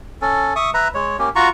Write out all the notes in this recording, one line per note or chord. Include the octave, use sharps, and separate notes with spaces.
C#4 A4
E5 C#6 D#6
B4 E5 A#5
G#3 C#5
A#3 C#4 G4
F4 F#4 A#5 C#6